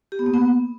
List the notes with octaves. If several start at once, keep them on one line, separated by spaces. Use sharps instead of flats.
G4
B3
A#3
B3